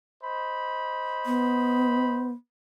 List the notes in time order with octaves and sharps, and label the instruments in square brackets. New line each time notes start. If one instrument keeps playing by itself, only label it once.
[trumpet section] C5 D#5 B5
[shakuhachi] B3